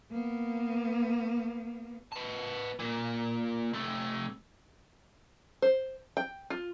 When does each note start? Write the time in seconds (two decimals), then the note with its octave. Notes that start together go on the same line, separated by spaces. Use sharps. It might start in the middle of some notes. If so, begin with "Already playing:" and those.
0.10 A#3 B3
2.12 B3 A5
2.80 A#2 A#3
3.73 C3 A3
5.62 C5
6.17 G5
6.50 F4